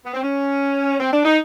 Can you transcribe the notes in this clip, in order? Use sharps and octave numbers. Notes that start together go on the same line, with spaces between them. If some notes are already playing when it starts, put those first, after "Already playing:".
B3
C4
C#4
C4
D4
D#4